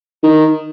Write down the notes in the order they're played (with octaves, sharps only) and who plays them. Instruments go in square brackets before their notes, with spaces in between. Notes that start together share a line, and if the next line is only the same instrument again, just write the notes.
[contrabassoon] D#3